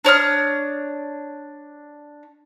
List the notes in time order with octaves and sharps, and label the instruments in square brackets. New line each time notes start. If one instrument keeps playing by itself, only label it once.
[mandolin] D4 C#5 D#6 F6